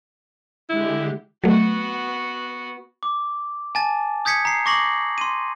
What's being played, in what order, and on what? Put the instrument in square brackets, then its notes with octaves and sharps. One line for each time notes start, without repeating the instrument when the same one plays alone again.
[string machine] D3 G#3 G4 [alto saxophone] E4
[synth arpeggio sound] F#3 A3 [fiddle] B3 F#4
[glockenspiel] D6
G#5 A5 A6
D#6 G6 G#6 B6 C#7
A#5 C7
C#6 D6 A#6 C7 F#7
C6 D#7